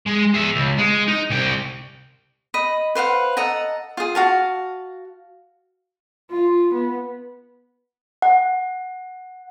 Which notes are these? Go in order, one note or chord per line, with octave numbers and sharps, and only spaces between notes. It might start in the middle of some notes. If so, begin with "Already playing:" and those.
G#3
G#4 E5
C#2
G#3
D#4
C2 G5
D#5 B5
B4 C5 F5 F#5
A4 D#5 F#5 A#5
F4 G#4
F#4 F5 A5
F4
B3
F#5